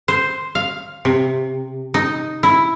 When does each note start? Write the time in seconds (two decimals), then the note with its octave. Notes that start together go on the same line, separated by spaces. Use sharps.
0.08 C5
0.55 F5
1.05 C3
1.94 D#4
2.43 E4